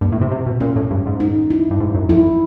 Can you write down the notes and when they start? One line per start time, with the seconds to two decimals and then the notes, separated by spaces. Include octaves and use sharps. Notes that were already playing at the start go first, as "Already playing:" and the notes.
0.01 G2 A#3
0.12 A2
0.21 C3
0.31 C3
0.46 B2
0.60 A#2 C#4
0.76 A2
0.91 G2
1.06 G#2
1.20 D#4
1.50 E4
1.71 G2
1.80 G#2
1.94 F#2
2.09 F2 E4